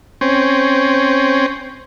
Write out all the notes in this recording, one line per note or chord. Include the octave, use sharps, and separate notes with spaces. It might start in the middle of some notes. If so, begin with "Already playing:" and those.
C4 C#4